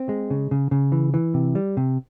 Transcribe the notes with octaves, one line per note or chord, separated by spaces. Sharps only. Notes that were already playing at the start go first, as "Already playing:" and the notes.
Already playing: C4
G#3
C#3
C#3
C#3
E3
E3
C3
G3
C3